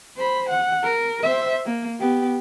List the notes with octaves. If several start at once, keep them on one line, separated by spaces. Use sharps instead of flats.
C5 B5
F#5
A#4
C5 E5
A#3
B3 G4